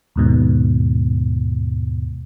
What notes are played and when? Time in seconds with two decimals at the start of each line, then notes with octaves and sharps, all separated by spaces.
0.16 D#2 G#2 B2